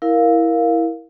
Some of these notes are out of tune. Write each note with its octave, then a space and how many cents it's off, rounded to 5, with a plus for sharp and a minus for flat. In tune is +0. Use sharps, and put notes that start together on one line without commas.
E4 -10 A#4 +5 F5 +0